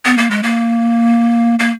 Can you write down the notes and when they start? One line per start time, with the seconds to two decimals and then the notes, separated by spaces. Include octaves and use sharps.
0.05 B3
0.18 A#3
0.31 G#3
0.43 A#3
1.59 A#3